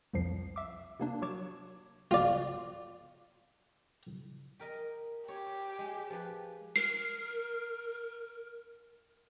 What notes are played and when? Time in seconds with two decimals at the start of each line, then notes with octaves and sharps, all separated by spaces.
0.13 C2 F2 F3 C7
0.56 E5 D6
1.00 C3 A#3 D4
1.22 F#3 C#6 D6 G#6 E7
2.11 F4 D5
4.59 G4 A#4 D#5
5.28 G4 C#5
5.79 G#3
6.10 F3 B4
6.76 A#4 C7